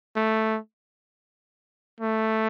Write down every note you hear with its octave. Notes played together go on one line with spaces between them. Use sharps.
A3
A3